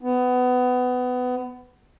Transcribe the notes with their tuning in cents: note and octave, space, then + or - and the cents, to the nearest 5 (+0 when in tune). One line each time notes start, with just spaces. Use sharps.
B3 +20